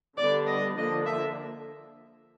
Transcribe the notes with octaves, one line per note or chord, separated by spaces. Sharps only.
D3 G3 B3 D4 D5
D#5
D3 F3 A#3 D4 D#5
E5